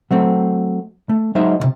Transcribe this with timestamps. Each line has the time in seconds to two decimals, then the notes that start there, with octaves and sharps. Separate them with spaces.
0.11 F#3 A3 C4
1.09 A3
1.35 F#3 G#3 D#4 C5 E5
1.60 C#2 C3